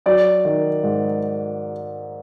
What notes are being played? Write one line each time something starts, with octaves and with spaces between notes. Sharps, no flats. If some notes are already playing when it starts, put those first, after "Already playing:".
F#3 D5
D#3
G#2